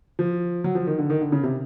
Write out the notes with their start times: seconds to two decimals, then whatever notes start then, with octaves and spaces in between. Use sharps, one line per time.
0.19 F3
0.64 F#3
0.75 F3
0.87 D#3
0.98 D3
1.10 D#3
1.21 D3
1.32 C#3
1.43 C3